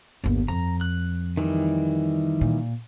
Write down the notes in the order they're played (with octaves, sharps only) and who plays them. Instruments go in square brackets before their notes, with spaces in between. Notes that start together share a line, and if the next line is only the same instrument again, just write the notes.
[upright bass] G1 D#2
[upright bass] F2 [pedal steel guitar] A#5
[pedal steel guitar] F#6
D#3 E3 G3
[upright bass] A#2